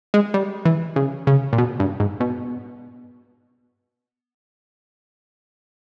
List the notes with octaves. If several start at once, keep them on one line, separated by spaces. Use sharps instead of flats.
G#3
G3
E3
C#3
C#3
A#2
B2
G2
G#2
B2